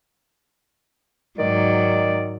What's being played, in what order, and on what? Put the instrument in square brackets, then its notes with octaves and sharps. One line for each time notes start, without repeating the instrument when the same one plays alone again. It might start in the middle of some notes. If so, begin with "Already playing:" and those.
[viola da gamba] G#2 F#3 [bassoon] D#3 [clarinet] D5